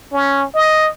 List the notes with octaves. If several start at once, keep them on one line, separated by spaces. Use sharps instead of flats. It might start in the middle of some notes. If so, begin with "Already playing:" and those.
C#4
D#5